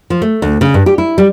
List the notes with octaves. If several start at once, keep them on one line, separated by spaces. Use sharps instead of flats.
F3
A3
D2
C#3
G2
G4
E4
G3